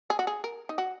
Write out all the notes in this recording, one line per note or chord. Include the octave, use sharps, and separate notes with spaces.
G#4
F#4
G#4
A#4
D#4
F#4